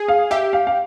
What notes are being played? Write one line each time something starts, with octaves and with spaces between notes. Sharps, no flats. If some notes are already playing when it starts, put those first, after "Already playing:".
Already playing: G#4
F5
G4 E5
F5
F5